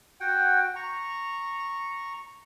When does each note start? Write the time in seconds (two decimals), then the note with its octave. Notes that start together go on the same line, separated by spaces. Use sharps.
0.20 F#4 F#5 G5
0.76 A#5 C#6